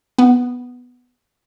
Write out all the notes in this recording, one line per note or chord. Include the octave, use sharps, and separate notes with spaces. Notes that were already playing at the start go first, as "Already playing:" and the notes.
B3